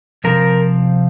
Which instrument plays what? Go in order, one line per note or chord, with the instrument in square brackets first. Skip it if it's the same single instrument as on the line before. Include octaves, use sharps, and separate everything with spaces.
[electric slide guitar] C3 F3 C4 A#4